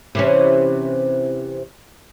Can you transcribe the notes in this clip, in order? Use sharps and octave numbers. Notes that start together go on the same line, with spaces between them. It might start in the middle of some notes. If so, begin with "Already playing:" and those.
C3 E3 C#4